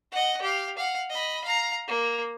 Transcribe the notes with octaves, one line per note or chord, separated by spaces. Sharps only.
D#5 F#5
G4 F5
F5 F#5
D#5 B5
F5 A#5
A#3